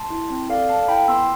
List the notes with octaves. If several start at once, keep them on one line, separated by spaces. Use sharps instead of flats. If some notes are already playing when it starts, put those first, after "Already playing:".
Already playing: A5 C6
E4
C4
A4 D5 F5
A4 F5 A5
E4 G5 B5
B3 C6 E6